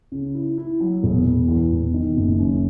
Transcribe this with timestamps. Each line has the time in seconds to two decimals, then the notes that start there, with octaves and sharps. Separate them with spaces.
0.12 C#3
0.34 E4
0.58 E4
0.80 F#3
1.03 E1
1.26 E1
1.48 E2
1.72 E1
1.94 D#3
2.17 F#1
2.39 F#2